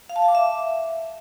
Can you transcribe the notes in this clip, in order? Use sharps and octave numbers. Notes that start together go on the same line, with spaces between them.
F5
A5
F5
D6
E5